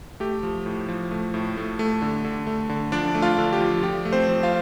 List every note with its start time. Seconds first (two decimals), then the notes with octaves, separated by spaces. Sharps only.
0.20 A3 G4
0.43 F3
0.66 A2
0.89 F3
1.11 A3
1.34 A2
1.57 A3
1.79 A3
2.02 D3
2.25 D3
2.47 A3
2.69 D3
2.92 F3 D4 D5
3.15 A3
3.22 F4 F5
3.38 D3
3.53 G4
3.61 F3
3.83 F3 G4
4.05 A3
4.13 C4 C5
4.28 F3
4.43 F4 F5